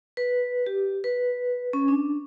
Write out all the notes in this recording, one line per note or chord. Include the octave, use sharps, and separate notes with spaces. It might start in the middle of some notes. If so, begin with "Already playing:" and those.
B4
G4
B4
C#4
D4